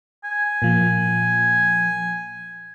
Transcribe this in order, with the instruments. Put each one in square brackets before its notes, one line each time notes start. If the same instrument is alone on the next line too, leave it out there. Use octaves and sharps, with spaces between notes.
[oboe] G#5
[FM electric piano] A#2 F3